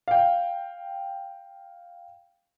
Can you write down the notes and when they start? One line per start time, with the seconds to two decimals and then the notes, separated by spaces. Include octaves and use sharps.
0.08 F5 G5